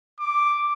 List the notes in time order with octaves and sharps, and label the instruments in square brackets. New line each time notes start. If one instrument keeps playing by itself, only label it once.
[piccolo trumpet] D6